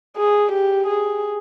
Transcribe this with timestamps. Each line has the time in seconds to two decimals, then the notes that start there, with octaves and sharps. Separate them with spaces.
0.17 G#4
0.52 G4
0.87 G#4